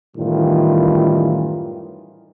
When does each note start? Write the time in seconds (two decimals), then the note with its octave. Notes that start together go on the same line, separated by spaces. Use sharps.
0.17 F#2 A2 D#3 E3 G3 F4